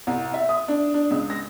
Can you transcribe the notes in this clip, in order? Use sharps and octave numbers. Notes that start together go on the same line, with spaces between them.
C2
E5
D#6
D4
D4
C#2
A#6